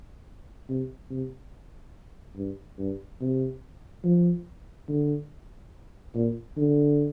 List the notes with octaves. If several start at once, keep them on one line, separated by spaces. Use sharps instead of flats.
C3
C3
G2
G2
C3
F3
D3
A#2
D3